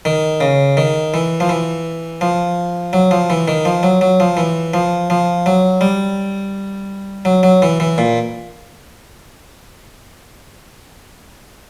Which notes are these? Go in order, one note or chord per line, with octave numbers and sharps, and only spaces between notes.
D#3
C#3
D#3
E3
F3
E3
F3
F#3
F3
E3
D#3
F3
F#3
F#3
F3
E3
F3
F3
F#3
G3
F#3
F#3
E3
E3
A#2